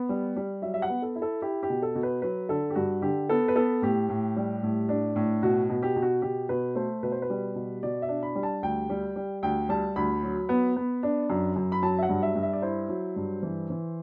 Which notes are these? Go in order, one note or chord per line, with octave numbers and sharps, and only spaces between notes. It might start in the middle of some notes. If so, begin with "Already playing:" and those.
Already playing: B3
G3
G3
F#3 E5
E5
F#5
B3
A4
E4
A4
E4 G4
G4
B2
A4
B2
B4
F#3 B4
D3 A4
G4
G2 F#4
D3 G4
B3 A4
B4
B3 A4
A2 G4
A2
G3
A2
D4
A2
B2 F#4
B2
G4
B2
F#4
B2 G4
B2 B4
A3 C5
B2 B4
C5
B4
G3
B2
B2 D5
E5
D4
B5
G3
A5
D2 G5
G3
G3
D2 G5
G3 A5
D2 B5
F#3
B3
B3
D4
F#2
F#2
B5
F#3 A5
E5
F#5
G2
E5
G2
E5
D5
E4 C5
F#3
G2
E3
E3